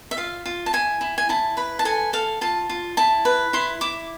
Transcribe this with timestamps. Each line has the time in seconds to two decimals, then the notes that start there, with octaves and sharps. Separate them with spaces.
0.11 E5
0.17 F4 F5
0.45 F4
0.66 A5
0.73 E4 G#5
1.01 E4
1.18 G#5
1.29 E4 A5
1.57 B4 B5
1.79 A5
1.85 A4 G#5
2.13 A4 F5
2.41 F4 A5
2.69 F4
2.97 E4 A5
3.25 B4
3.53 E4 C6
3.81 E4 D6